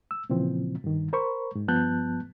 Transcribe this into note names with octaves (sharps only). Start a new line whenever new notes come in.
E6
A#2 C#3 E3 F3 C4
G2 D#3
A#4 C5 B5 C#6
G#2
G2 F3 B3 A5 F#6 G6